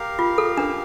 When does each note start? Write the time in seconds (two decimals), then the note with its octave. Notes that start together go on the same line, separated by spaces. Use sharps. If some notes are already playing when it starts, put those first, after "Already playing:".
Already playing: G4 A#4 F5
0.19 F4
0.38 A4
0.57 D4